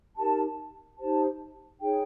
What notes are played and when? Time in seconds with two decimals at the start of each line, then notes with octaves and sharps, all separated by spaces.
0.15 D#4 G4 A#4 A5
0.98 D#4 G4 C5 A5
1.81 D#4 G#4 C#5 G5